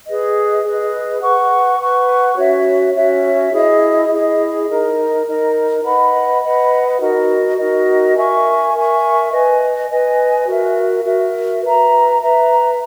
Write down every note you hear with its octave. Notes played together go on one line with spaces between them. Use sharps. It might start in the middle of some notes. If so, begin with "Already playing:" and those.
G#4 B4 D#5
G#4 B4 D#5
B4 F#5 C#6
B4 F#5 C#6
C#4 F#4 C#5 E5
C#4 F#4 C#5 E5
E4 G#4 D#5
E4 G#4 D#5
D#4 A#4 D#5
D#4 A#4 D#5
B4 D#5 F#5 B5
B4 D#5 F#5 B5
D#4 F#4 A#4 D#5
D#4 F#4 A#4 D#5
A#4 E5 G#5 C#6
A#4 E5 G#5 C#6
B4 D#5 G#5
B4 D#5 G#5
F#4 A#4 E5
F#4 A#4 E5
B4 E5 A#5
B4 E5 A#5